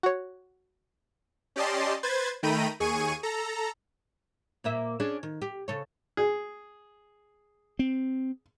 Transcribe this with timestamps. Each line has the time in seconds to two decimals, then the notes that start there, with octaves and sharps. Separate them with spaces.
0.03 F#4 C#5
1.56 C#4 G4 D5 D#5 A5 C6
2.03 B4 C5 G#6 A6
2.43 D#3 A3 G5 A#5 B5 D#7
2.80 D#2 G#4 G#5 C#6 D#7
3.23 A4 A#5
4.64 A#2 A#3 E5
5.00 C#4 D4 G#4
5.23 D#3
5.42 G4
5.68 C#3 A4 C#5
6.17 G#4
7.79 C4